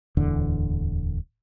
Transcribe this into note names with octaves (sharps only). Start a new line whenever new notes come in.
D1 E2 D3